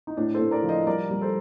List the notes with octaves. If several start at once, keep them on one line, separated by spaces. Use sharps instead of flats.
D#4
A2 D4
A4 C5
A2
A#4 D5
F3
C5 D#5
G3 A#4 D5
G3
A4 C5